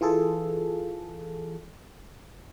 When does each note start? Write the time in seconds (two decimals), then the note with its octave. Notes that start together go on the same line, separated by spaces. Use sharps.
0.01 E3 F4 G#4 A4